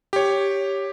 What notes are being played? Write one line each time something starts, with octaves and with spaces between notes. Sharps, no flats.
G4 C#5